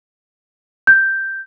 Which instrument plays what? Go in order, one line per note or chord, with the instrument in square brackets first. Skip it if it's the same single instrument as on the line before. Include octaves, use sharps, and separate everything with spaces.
[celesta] G6